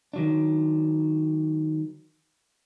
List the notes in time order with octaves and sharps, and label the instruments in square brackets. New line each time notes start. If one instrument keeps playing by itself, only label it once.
[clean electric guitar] D#3 F#3 D4